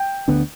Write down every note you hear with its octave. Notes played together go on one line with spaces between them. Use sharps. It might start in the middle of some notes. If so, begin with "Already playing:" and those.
Already playing: G5
D2 D3 B3 D4